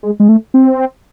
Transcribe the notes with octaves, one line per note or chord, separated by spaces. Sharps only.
G#3
G#3
A3
C4